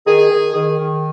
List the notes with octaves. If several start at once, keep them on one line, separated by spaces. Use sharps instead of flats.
D#3 G#4
D#3
D#3
D#3